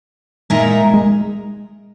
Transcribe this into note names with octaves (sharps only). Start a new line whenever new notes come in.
A#2 G#3 D#4 A#4 E5
G#3